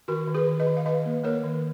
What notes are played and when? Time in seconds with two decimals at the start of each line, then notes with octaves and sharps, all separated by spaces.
0.08 D#3 F#4 A#4
0.27 D#3
0.35 G#4 B4
0.47 D#3
0.60 B4 D#5
0.67 D#3
0.77 F5
0.86 D#3 B4 D#5
1.05 A#3
1.24 A#3 A#4 C#5
1.44 D#3